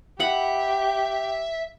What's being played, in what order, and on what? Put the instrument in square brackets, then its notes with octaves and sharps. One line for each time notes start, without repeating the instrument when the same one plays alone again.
[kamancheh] G4 [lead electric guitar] E5 [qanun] F#5 B5